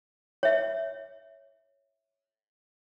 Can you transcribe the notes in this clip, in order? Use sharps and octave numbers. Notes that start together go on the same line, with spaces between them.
C#5 E5